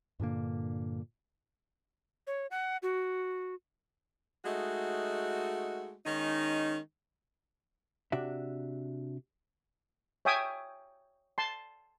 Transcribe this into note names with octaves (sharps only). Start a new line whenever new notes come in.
G2 A#2 D3 A#3
C#5
F#5
F#4
G#3 A3 D#4 F#4
D#3 G#3 C#4 D#4
C3 D4 F#4 E5
C#5 E5 G5 G#5 D#6
A5 C6